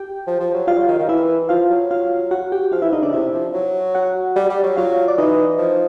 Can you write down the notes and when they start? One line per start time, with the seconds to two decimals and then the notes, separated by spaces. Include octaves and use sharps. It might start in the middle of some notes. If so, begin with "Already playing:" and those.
Already playing: G4 G5
0.27 F3
0.40 F3
0.54 F#3
0.67 G3 F4 F5
0.77 F#3
0.88 D#3
0.98 D#3
1.08 E3 E4 E5
1.49 F3 F4 F5
1.70 F#3
1.91 F4 F5
2.31 F#4 F#5
2.52 G4 G5
2.72 F3 F4 F5
2.82 E3 E4 E5
2.92 D3 D#4 D#5
3.02 C#3 D4 D5
3.13 C3 E4 E5
3.34 F3
3.54 F#3
3.95 F#4 F#5
4.36 G3
4.50 G3
4.63 F#3
4.76 F#3 F4 F5
5.08 D5
5.18 E3 D#4 D#5
5.58 F3